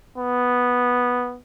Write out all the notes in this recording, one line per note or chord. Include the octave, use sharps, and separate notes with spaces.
B3